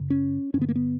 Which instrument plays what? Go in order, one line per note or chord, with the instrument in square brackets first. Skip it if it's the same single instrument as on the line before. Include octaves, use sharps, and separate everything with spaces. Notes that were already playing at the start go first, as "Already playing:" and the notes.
Already playing: [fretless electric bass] F#2 C#3
C#4
G2 C#4
D3 B3
A#3
B3